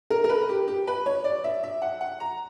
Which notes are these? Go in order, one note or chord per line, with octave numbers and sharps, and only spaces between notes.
A#4
A#4
B4
G4
G4
B4
C#5
D5
E5
E5
F#5
F#5
A#5